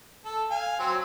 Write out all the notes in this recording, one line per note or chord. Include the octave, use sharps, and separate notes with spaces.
A4
F5 G#5
F#3 C4